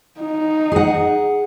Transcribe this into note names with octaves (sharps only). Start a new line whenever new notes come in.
D#4
G#4 F#5